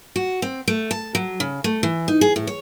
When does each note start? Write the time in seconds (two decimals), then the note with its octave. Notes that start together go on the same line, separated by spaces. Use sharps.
0.16 F#4
0.42 C4
0.68 A3
0.91 A5
1.15 F#3
1.40 C#3
1.64 A3
1.83 E3
2.08 D#4
2.21 G#4
2.36 A2
2.47 C#5